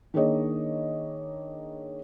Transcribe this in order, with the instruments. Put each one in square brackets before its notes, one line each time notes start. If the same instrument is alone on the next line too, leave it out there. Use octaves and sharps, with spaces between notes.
[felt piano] D#3 A#3 D4 G#4 C#5 D#5